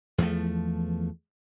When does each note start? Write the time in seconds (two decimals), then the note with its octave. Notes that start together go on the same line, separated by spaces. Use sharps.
0.18 E2 F3 A3